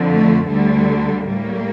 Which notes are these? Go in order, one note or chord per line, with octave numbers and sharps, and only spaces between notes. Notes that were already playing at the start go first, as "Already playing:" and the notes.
Already playing: F2 D3 F3
A3
D2 D3 G3 A3
A2 G3 A#3